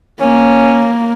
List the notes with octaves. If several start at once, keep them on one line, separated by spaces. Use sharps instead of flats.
A#3 C#4